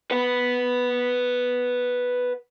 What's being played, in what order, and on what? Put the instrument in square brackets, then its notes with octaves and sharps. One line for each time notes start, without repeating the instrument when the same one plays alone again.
[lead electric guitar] B4 F#5